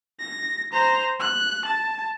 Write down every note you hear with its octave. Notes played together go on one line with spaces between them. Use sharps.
A#6
C5 A#5
F#6
A5